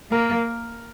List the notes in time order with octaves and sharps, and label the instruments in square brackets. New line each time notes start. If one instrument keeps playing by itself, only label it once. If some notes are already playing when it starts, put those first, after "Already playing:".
[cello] A#3 [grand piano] A#4